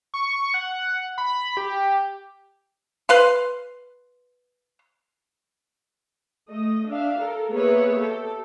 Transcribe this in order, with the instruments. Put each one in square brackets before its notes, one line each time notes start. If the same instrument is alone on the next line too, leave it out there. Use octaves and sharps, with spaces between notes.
[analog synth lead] C#6
F#5
B5
G4
[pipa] B4 F5 C6
[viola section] A3 D#5
D4 E5 F5
A4 A#4
A#3 B3 G#4 B4 C#5 E5
G4 A4